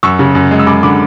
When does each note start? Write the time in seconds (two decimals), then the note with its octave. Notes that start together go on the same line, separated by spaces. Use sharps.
0.03 F#2 C#6 E6
0.19 C#3
0.35 F#2
0.51 G#3
0.59 E6
0.67 F#2 B5 D6
0.83 D3 B5 D6